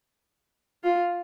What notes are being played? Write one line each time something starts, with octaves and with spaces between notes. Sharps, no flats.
F4